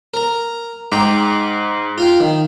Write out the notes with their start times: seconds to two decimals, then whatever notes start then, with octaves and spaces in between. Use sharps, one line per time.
0.14 A#4 A#5
0.92 G#2 G5 A#5 D6
1.98 F4 F5 G5
2.20 D#3